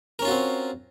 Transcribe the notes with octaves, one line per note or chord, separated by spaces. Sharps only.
C4 C#4 F4 F#4 A#4